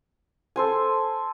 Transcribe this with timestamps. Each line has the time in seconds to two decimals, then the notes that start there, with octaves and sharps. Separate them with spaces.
0.56 A4 C5 G#5